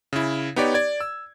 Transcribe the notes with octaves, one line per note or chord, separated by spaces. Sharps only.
C#3 E4
B3 D#4 G4 C#5 D5
D5 G#6
E6